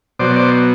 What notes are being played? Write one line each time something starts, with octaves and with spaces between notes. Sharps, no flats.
B2 F#3 C5 D5
C5 D5